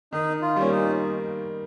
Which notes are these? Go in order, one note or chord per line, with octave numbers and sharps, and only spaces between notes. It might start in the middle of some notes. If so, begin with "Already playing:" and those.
D#3 D#4
F4
G3 A#3 C#4
D#4